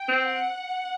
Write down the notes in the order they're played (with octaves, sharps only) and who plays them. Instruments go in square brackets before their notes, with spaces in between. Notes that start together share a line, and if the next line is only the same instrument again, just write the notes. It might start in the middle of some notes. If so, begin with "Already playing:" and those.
Already playing: [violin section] G5
[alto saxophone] C4
[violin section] F#5